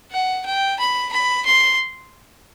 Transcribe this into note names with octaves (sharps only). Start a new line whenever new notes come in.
F#5
G5
B5
B5
C6